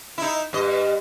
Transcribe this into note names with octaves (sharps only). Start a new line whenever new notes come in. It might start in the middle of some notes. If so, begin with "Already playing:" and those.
D#4 E4
G2 D#5